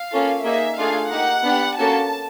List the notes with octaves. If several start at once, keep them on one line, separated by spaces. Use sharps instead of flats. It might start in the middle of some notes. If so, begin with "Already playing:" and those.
Already playing: F5
A#3 C#4 F4 A4
A#3 D#4 G#4 E5
A3 D4 F4 G#4 F5
A#3 D#4 G4 F#5
B3 D4 G4
A#3 C#4 F#4 A4 A5